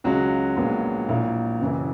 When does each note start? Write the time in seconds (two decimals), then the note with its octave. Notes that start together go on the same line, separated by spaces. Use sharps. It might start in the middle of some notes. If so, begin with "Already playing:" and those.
0.04 C#2 C#3 F#3 G#3 F#4
0.56 A#1 A#2 G#3 B3
1.09 A#1 A#2 A#3 E4
1.61 F#1 F#2 E3